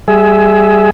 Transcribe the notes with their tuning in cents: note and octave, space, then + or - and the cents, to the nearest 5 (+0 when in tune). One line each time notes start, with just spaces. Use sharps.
G3 +0 G#4 +20 E5 +0